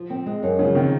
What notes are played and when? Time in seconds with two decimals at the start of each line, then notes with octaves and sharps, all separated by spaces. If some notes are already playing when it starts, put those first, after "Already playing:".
Already playing: F3
0.10 C4
0.26 G#3
0.43 F#2
0.59 C#3 F3
0.75 D#3 C4